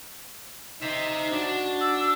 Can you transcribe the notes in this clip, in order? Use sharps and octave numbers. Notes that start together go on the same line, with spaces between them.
D#4 C5 E5
D4 F#4
E6